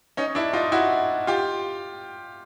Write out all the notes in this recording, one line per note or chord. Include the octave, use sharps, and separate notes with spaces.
C#4 D#4
D4 E4
D#4 F4
E4 F#4
F4 G4